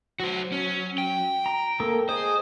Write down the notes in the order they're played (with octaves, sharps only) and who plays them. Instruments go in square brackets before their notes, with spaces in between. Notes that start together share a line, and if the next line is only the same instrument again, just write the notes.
[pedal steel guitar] F#3 [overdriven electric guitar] F#4 C5
[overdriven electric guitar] C#4
G5
[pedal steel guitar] A#5
A#3 A4 A#4
[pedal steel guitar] G#4 D#5 [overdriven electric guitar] C5